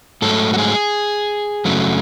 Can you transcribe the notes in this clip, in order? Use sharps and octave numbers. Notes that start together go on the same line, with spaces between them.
G#2 F#3 A3 A4
F#4
G#4
F#2 C#3 F#3 A3